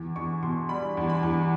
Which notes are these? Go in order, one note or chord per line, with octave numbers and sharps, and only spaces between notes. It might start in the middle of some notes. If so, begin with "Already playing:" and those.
Already playing: E2
E2 C#6
B2 C6
G3 B5
E2
B5
E2